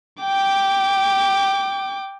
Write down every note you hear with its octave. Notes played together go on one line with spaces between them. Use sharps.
G5 D6